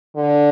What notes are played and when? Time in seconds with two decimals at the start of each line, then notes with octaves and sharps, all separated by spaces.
0.17 D3